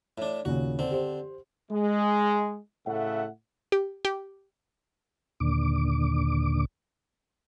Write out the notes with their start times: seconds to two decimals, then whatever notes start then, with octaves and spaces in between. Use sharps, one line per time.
0.18 A2 D4
0.45 D#2 A#2 C#3 F#4
0.79 D3 C4
0.91 G4 C5
1.71 G#3
2.87 A2 C#3 A3 E5 F#5
3.72 G4
4.05 G4
5.40 D#2 A#2 D3 D6